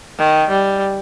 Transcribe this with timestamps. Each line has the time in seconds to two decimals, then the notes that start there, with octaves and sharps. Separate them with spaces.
0.19 D#3
0.49 G3